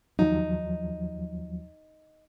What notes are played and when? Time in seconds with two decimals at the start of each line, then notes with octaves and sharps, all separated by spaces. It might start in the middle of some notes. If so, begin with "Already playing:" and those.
0.19 D#2 F3 F#3 D#4